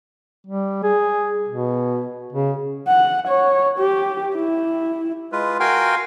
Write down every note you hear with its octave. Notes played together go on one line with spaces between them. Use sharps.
G3
G#4
B2
C#3
F#5
C#5
G4
E4
G#3 F4 B4
F#4 A#4 F5 G5 G#5 C6